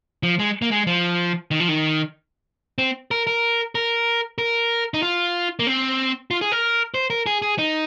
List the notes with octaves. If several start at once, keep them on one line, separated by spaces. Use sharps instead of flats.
F3
G#3
A#3
G#3
F3
D#3
F3
D#3
C4
A#4
A#4
A#4
A#4
D#4
F4
A#3
C4
F4
G#4
A#4
C5
A#4
G#4
G#4
D#4